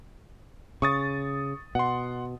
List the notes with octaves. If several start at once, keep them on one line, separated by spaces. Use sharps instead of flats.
C#3 C#6 D#6 A6
B2 F#5 C6